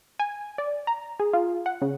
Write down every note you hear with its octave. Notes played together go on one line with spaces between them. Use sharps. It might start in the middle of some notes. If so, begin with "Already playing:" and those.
G#5
D5
A#5
G#4
F4
F#5
C#3